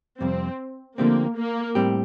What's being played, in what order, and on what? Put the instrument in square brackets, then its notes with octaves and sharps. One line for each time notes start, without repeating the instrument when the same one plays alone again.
[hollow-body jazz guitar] F2 C3 G3 [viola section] C4
[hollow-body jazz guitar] D3 F3 A3 C4 G4 [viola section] A#3
[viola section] A#3
[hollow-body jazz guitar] A2 G3 C4 G4